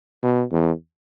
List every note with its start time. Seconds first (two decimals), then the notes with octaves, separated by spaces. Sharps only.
0.23 B2
0.52 E2